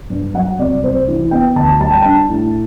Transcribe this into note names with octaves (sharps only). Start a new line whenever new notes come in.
G2
F#3 F#5
C2 D5
C2 C5
E3
B3 G5
D2 A5
G3 A5
G5
D4 A5
A2